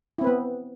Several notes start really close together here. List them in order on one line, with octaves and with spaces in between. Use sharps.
E4 C4 B4 B3